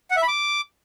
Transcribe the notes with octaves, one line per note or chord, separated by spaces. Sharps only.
F#5
E5
B5
D6